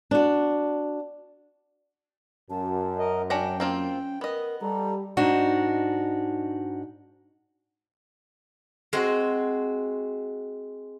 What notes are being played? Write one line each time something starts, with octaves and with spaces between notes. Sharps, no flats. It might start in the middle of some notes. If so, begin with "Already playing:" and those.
D4 F#4
F#2 A5
A#4 D#5
C#4 D4 C#5 G5 A#5
A#3 C4 C#4 F4
B3 A#4 D#5
G3 A4 A#5
G#2 D4 D#4 F#4
G#3 C4 F#4